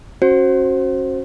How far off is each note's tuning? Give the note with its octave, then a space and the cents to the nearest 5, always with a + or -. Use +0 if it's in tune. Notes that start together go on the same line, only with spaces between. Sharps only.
C#4 -25 F#4 +0 C5 +15